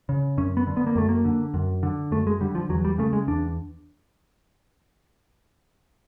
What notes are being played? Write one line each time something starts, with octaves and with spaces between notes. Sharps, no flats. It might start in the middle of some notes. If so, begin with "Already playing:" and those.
C#3
F#2 C#4
B3
D3
B3
A#3
F#2 A3
A#3
D3
F#2
D3
F#2 A3
G#3
D3 G3
F3
E2 F#3
G3
C#3 A3
G#3
E2 D4